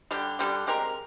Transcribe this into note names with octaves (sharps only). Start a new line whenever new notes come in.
D3 G3 D4 G4
D3 G3 D4 G4
G#3 C4 G4 A#4